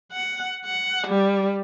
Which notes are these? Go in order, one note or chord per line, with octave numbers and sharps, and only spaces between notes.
F#5
F#5
G3